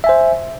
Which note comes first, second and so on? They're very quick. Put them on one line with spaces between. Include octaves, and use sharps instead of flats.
E5 G#5 C5